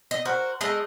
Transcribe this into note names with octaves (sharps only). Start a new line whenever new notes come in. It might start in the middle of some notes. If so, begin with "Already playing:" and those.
D#5
F#4 A#4 C5
G#3 A3 D#5